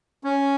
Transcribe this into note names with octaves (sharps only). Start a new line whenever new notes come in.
C#4